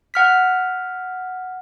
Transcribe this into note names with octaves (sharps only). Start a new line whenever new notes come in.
F#5 F6 B6